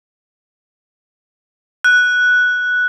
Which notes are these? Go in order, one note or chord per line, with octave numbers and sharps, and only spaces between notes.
F#6